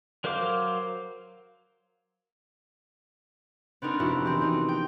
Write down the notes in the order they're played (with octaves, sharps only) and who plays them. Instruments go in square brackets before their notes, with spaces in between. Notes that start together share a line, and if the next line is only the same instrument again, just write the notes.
[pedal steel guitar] F#3 A#4 C5 F5 D6
[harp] B3 C4 D4 D#4 A#4
F1 E4 F#4
E3 C4 G4
C4 D#4
G5